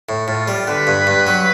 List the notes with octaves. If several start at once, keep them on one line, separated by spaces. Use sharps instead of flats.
A2
A2 F4
G3
D3 B4
G2
G2
F#3